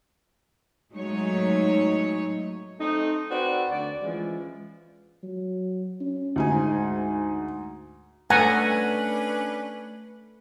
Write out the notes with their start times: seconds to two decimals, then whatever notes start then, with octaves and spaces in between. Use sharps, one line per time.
0.92 F#3 G#3 A3 D#4 C#5
2.79 A3 C4 D#4
3.30 C4 F#4 B4 D5
3.70 D2 D5
4.01 E3 F3 G#3 C#4
5.23 F#3
6.00 C#4
6.36 D2 G#2 D#4 G#5
8.30 A3 C#4 D4 B4 F#5 G#5 A#5